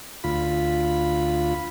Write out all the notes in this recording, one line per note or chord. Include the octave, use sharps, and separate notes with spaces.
D2 F4 B5